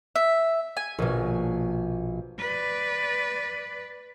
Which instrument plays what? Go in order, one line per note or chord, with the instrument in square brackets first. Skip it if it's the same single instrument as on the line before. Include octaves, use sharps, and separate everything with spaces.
[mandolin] E5
G#5
[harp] A#1 B2
[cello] B4 D5